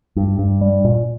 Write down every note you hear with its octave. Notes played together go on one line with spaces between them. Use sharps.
G2
G2
G3
A#2